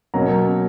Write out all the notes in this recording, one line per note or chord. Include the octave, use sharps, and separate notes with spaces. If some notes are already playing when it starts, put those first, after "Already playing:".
B2 F#3 A#3 C#4 A#5